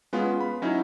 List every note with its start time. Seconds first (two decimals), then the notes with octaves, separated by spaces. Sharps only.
0.13 G#3 B3 C#4 F4
0.41 B5
0.62 F#3 C#4 D#4 E4